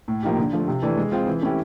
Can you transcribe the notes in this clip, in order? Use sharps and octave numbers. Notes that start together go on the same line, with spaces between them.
A2
F3 A#3 D#4 G4
D3
F3 A3
C3
E3 A3 D4
G#3
C4 F4 G#4
E3
A3 C#4 E4 G4